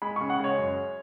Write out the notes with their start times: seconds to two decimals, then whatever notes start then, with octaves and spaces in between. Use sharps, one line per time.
0.02 G#3 B5
0.16 C#3 C#6
0.30 F#5
0.40 G#3 C#5
0.58 F#2